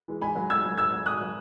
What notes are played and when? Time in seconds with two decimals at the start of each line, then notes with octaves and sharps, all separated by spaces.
0.08 E3 G#3
0.22 G#2 G#5 B5
0.36 F#3
0.50 G#2 E6 G#6
0.65 F#3
0.78 G#2 E6 G#6
0.92 F#3
1.06 G#2 D#6 F#6
1.20 F#3